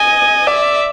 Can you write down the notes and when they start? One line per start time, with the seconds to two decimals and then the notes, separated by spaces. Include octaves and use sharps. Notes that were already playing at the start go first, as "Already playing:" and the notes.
Already playing: D#5 G#5
0.47 D5 E5